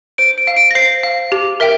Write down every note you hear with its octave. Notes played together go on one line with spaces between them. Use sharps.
C5 D7
D7
F5
D7
A#6
C5 C7
F5
G4
A#4 E5 G5